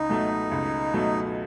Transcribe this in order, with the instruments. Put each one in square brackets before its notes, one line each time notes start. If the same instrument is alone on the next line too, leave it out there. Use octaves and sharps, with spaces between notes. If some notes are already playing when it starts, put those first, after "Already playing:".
Already playing: [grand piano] C#2 [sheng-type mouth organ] D#4
[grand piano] B2 F#3 A3
C#2
B2 F#3 A3